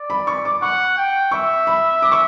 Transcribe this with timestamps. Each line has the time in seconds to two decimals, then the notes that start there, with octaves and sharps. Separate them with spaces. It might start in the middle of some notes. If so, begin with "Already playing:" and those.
Already playing: D5
0.10 B5
0.27 C#6
0.45 D6
0.62 F#5 C#6
0.97 G5
1.31 E5 C#6
1.67 B5
2.02 D6
2.12 C#6